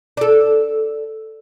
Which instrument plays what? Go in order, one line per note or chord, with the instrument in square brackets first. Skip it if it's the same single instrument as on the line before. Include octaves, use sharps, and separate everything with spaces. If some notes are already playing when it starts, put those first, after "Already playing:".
[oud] D4 A4